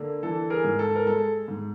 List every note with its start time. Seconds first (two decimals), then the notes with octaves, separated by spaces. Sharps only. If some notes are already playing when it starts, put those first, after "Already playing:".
Already playing: D3 A#3
0.23 E3 A4
0.50 G#4 A#4
0.64 G#2
0.79 A4
0.95 A#4
1.06 G#3 A4
1.48 G#2